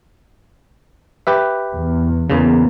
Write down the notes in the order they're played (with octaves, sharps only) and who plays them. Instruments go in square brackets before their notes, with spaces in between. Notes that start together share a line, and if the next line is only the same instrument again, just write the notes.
[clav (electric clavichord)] G4 B4 E5
[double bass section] E2
[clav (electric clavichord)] E2 C#3 [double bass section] A#3 B3